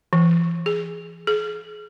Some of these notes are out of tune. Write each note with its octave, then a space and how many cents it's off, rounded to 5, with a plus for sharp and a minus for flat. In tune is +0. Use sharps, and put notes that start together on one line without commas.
E3 +35
G#4 +0
G#4 +35